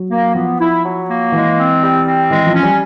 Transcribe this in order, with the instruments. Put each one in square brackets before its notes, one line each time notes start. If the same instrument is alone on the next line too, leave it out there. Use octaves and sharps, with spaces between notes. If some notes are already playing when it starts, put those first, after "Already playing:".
Already playing: [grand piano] F#3
[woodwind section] A#3
[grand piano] F3 [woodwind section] B3
[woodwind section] E4
F#3
A#3
[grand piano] E3 [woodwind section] G#3
[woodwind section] C4
G3
C4
[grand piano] E3 [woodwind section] G#3
[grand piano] F3
[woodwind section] C#4
[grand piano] G3